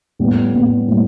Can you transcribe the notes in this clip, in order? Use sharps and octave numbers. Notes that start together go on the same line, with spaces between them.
A2 G3 B3
A2 G3 B3
A2 G3